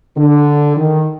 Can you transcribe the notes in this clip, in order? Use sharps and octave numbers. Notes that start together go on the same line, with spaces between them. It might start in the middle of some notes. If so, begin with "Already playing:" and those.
D3
D#3